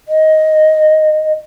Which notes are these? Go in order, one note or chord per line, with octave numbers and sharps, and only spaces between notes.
D#5